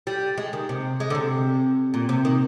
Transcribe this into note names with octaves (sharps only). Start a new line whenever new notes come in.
G3
G#3
D#3
C3
G#3
D3
C3
A#2
C3
D#3